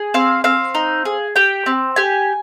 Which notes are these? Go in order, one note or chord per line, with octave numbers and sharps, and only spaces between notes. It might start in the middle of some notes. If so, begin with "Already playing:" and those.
Already playing: G#4
C4 F5
C4 F5
D#4
G#4
G4 G5
C4
G4 G#5